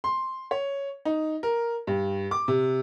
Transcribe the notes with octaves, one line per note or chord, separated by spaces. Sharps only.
C6
C#5
D#4
A#4
G2
D6
C3